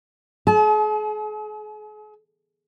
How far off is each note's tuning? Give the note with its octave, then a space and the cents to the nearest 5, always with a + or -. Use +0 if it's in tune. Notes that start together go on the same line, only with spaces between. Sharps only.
G#4 +40 A5 -45